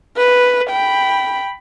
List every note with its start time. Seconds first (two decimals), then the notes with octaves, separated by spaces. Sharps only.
0.17 B4
0.70 G5 B5